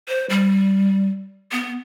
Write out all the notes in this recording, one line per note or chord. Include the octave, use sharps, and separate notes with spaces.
C5
G3
B3